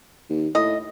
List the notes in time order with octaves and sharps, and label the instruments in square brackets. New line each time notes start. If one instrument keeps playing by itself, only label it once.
[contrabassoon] D#2
[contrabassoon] A2 [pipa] D#5